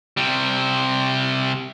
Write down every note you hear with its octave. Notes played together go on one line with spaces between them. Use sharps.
C3 G3